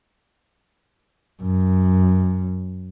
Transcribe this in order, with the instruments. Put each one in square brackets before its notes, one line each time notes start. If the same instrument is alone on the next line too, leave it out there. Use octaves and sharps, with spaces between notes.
[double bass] F#2